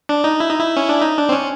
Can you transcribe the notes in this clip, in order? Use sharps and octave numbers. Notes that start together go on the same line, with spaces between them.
D4
D#4
E4
D#4
E4
C#4
D4
D#4
D4
C4
C#4